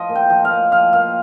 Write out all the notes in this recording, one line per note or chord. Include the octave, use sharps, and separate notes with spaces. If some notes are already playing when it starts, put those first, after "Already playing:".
Already playing: F3 D#5
A#2
G5
F3
F5
A#2
F3 F5
A#2 F5